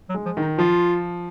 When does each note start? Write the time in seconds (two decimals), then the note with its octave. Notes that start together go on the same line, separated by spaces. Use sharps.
0.09 F#3
0.14 G#3
0.26 F3
0.37 D#3 D#4
0.58 F3 F4